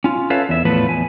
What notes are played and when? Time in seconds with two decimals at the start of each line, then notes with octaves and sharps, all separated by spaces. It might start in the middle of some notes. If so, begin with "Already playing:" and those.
0.04 C#4 F4
0.30 A4 B4 C#5 E5 F5
0.49 E2 E5
0.65 E2 A2 F3 A3 B3 B4
0.89 E2 G#5